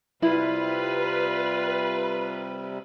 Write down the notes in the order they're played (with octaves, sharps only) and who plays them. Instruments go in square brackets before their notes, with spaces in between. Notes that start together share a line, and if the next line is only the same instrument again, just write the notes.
[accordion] C3 G3 [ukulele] E4 [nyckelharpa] F4 [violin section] B4